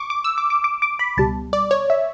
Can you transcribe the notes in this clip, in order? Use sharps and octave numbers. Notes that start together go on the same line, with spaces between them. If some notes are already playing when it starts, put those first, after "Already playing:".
Already playing: C#6 D6
D6
E6
D6
D6
D6
D6
B5
C#2 B2 G3 A5
D5
C#5
E5